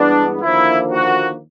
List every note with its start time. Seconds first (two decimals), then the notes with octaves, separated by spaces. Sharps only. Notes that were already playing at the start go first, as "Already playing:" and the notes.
Already playing: G2 E3 G#3 B3 D4
0.42 D#2 D3 F3 A#3 E4
0.92 F#4